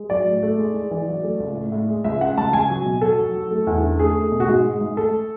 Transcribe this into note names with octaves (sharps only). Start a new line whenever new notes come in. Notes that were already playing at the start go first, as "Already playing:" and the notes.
Already playing: G#3
F#3 D5
A2
A3
G#3
G#3
E3
F#3
A3
C#2
A2
A2
G#3
C#2 E5
C#3 F#5
C#2 A5
C#2 G#5
F#3
B2
F#3 A4
F#3
F#3
A3
E2
D3
A3 G#4
A3
B2
F#4
G#2 G#4
G#3
G#2
A3 A4